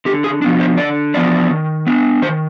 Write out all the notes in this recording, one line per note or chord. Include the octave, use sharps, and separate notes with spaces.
D3 G4
G#4
F3 B3 D4
C5
D3 D5
F3 B3 D4 D5
D#3
B3 D4
D#3 C5